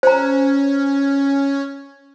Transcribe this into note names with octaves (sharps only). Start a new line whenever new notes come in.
C#4 C5 A#5